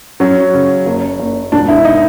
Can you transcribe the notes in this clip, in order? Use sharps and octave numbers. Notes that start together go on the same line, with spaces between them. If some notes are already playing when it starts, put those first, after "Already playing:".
F#3 C#4
C#3
F#1
F#1
E1 D4
E4
D#4